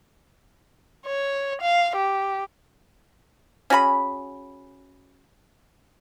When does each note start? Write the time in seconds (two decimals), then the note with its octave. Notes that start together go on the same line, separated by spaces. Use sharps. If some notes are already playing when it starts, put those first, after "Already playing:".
1.06 C#5
1.61 F5
1.96 G4
3.70 C#4 F#4 G#4 B5